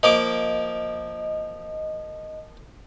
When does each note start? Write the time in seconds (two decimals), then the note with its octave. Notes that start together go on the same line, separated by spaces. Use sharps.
0.03 F3 A#3 D#5 D6